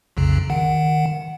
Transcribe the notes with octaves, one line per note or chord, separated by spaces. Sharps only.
B1 F2 C#3
D#3 F#5